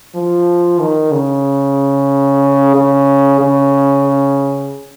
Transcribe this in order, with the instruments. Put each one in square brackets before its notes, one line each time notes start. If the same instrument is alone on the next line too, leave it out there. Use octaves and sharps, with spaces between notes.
[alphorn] F3
D#3
C#3
C#3
C#3